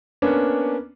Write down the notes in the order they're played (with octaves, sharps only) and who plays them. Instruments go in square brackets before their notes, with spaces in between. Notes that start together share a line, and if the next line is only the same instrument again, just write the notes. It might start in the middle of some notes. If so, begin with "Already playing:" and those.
[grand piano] A#3 B3 C#4 D4